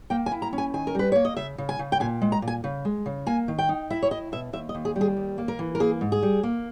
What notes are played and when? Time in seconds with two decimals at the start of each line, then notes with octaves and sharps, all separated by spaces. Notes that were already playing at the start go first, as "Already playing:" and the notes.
0.10 A#3 G5
0.26 G#5
0.32 E4
0.42 A#5
0.53 C#4
0.58 G#5
0.74 D#3 G#5
0.87 A#4
0.95 G3 B4
1.12 A#3 C#5
1.25 D#5
1.36 C#3 E5
1.58 C#3
1.69 G#5
1.79 C#3
1.92 G5
2.00 A#2 G#5
2.22 G#3
2.32 A#5
2.42 A#2
2.48 G#5
2.64 C#3
2.85 G#3
3.06 C#3
3.26 A#3 G#5
3.48 D#3
3.58 G5
3.69 D#4
3.90 E4 E5
4.02 C#5
4.11 E4 D#5
4.32 B2 E5
4.53 D#2 E5
4.69 D#5
4.74 D#2
4.85 G#4
4.96 G3
5.01 G#4
5.17 D#2
5.38 A#3
5.48 A#4
5.59 E3
5.75 A#4
5.80 A#3 G#4
6.01 G#2
6.12 G#4
6.23 G3
6.43 A#3